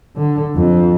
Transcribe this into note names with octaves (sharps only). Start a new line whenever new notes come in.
D3
F2